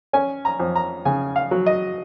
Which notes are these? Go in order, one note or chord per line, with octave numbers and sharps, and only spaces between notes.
C#4 G#5
A#5
F2
A#5
C#3 G#5
F5
F#3
D#5